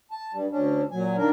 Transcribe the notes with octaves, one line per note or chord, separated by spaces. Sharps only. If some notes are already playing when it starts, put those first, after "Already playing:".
A5
G2 G3
D2 C#4 D4
A#2 F#3 G#5
D#2 D#3 A#3 D4 A#4